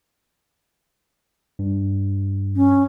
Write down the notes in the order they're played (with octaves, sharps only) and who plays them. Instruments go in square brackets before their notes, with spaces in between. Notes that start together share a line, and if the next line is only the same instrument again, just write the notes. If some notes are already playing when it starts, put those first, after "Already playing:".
[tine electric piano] G2
[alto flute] C#4